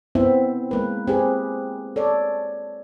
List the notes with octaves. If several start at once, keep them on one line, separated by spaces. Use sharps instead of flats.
B3 C4 E4 C5 E5
G#3 A#3 B4
C4 G4 G#4 B4
A4 C#5 D5